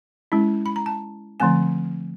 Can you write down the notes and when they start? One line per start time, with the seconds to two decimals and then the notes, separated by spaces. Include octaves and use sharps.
0.32 G#3 C#4 E4
0.66 B5
0.76 A#5
0.86 A5
1.40 D3 F3 A3 C4 G#5